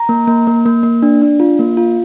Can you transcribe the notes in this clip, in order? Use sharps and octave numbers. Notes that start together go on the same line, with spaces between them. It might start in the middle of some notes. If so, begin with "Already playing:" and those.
Already playing: A#5
A#3
A#3
A#3
A#3
A#3
D4
D4
F4
A#3
F4